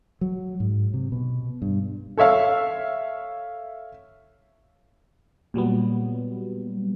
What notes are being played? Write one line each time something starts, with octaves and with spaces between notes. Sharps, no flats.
F#3
G#2
C3
B2
G2
A4 C#5 E5 F5
A#2 F#3 G3 B3